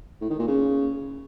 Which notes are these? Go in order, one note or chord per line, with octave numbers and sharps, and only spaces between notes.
A2
D#3
A#2
C#3